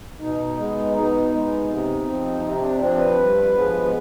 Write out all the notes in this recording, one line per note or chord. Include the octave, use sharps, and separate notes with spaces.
B2 D#4
G#3 B3
B2 D#4
G#3 B3
C3
F3 C4
C3 C4
D4
F3 C4 D4
B4
G2
F3 G#3 B3